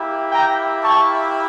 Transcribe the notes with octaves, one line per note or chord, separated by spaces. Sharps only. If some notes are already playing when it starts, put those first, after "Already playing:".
Already playing: A#3 E4 G4
G5 A#5
A5 C#6